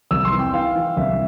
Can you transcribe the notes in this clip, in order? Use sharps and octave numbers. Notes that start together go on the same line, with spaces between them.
C2 E6
C6
E3
G5
E3 F5
E3
C2 E5